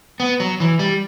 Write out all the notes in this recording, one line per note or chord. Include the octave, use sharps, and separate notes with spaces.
B3
F#3
E3
G3